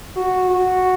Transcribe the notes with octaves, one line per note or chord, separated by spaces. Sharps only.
F#4
F#4